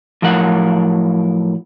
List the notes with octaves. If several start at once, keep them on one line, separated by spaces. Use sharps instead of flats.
A2 F3 F#3 A#4 F#5